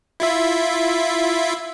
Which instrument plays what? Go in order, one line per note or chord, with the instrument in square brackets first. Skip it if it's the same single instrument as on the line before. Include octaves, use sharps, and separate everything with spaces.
[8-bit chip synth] E4 F4 E5